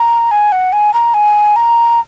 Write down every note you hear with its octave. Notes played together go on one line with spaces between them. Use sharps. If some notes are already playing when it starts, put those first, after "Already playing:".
Already playing: A#5
G#5
F#5
G#5
A#5
G#5
A#5